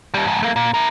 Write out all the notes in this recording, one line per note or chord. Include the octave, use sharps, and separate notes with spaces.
D#2 G3
F2 G#2
A3 A#3
A#2
E4 A#4